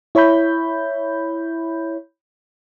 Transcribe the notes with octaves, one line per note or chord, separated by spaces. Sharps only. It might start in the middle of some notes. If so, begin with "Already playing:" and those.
E4 C#5 E5 B5 G6